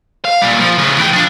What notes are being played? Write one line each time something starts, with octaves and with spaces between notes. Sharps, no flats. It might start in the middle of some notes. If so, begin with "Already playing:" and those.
F5
A#2 G3
F3
A2 C#3
E3 G5
F3 D4